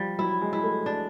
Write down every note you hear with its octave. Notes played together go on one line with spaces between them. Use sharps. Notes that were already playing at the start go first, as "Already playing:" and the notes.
Already playing: F3 G3
F#3 E4
G#3
E4
A3
D4